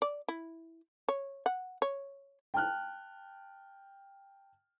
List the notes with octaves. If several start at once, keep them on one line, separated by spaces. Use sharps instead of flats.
D5
E4
C#5
F#5
C#5
G5 A5 F6 F#6